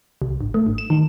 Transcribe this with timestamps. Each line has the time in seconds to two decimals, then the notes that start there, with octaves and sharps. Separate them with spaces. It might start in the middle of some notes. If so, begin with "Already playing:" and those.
0.22 C2
0.41 G#1
0.54 A3
0.67 G#1
0.78 E7
0.90 D#3